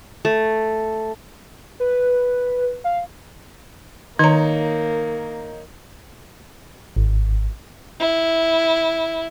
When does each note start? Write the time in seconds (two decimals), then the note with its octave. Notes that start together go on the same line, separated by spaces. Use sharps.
0.25 A3
1.80 B4
2.84 F5
4.19 D#3 A#3 D#4 C#5 A#5
6.96 G#1
8.00 E4